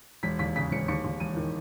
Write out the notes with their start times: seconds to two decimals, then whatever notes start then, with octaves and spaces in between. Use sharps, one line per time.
0.23 E1 B6
0.39 D#2 B6
0.56 C#3 B6
0.72 E1 C#7
0.88 D#2 C#7
1.04 D#2
1.20 E1 D#7
1.37 D#3